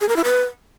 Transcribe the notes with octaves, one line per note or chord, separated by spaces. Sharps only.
G#4
A#4
E4
B4